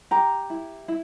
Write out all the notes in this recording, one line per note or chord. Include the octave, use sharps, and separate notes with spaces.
G4 A#5
E4
E4